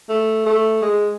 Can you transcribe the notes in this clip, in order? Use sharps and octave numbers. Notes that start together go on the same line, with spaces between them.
A3
A3
G#3